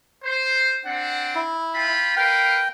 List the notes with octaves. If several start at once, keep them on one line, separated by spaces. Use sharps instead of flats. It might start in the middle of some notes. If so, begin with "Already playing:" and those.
C5
C4 D4 F#5
E4
F4 G5 B5
A#4 B4 F5 G5